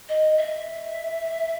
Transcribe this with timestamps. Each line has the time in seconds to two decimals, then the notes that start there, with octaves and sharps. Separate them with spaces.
0.08 D#5
0.37 E5